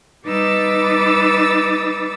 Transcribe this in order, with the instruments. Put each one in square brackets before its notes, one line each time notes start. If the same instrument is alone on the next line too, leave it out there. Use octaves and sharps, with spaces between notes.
[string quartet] G3 D#4 B4 D6 E6 A6